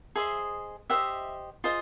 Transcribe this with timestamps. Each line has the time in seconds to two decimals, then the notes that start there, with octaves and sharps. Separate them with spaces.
0.16 G#4 C5 D#5 E5
0.90 G4 C5 D#5 E5 F#5
1.64 F4 G#4 C5 D#5